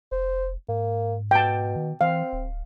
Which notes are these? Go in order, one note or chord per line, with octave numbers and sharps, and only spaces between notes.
F1 C5
G#2 A#3
B2 G5 A5
D#3
E3 C4 F5
D1